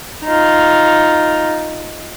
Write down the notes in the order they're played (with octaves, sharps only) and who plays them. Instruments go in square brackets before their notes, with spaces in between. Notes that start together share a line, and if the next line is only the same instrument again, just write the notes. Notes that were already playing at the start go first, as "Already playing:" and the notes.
[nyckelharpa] D#4 F4